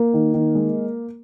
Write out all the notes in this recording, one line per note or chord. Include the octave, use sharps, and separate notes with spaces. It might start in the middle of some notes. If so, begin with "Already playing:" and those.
Already playing: A#3 A#4
D#3
D#3
G#3